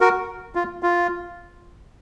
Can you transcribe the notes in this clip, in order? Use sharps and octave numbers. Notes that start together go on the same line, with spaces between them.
F#4 A#4
F4
F4